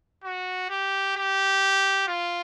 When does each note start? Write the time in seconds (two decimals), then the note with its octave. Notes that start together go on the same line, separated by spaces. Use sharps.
0.24 F#4
0.70 G4
1.16 G4
2.08 F4